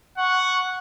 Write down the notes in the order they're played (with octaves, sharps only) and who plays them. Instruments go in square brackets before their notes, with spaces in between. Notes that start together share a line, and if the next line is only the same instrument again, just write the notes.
[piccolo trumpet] F#5 [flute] C#6